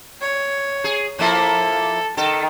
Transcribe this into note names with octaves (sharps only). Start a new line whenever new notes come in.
C#5
G#4
F3 A#3 E4 A4
D#3 A4